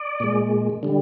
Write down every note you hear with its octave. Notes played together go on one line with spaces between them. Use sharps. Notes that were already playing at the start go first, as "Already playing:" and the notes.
Already playing: D5
A#2 G#3
D3 G3